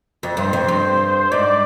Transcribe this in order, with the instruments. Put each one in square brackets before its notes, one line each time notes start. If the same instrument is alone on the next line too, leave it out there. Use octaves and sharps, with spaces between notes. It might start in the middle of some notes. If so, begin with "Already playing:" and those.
[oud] F2
[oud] G2 [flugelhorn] C5
[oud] F2
G2
[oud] G#2 [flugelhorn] D5